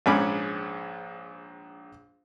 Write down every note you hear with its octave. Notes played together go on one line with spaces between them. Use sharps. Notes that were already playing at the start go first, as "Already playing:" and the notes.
A#1 G#2 C#4 B5 D6